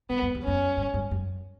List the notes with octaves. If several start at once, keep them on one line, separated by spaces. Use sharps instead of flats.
G2 B3
F#2
E2
F#2 C#4
G2
G2
F#2